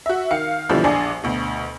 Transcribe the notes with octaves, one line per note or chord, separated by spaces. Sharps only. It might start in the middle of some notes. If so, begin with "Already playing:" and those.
F#4 E5
D#3 F5 C#7
C#2 B2 D3 E3 F3 G3
A#1 D4 D5 G#5 C7
D2 B2